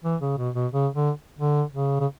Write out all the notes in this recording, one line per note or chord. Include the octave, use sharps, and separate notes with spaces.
E3
C#3
B2
B2
C#3
D3
D3
C#3
C#3